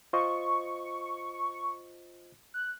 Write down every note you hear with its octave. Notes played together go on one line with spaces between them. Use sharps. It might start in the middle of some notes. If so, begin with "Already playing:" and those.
F4 C5 D#5 C#6
F#6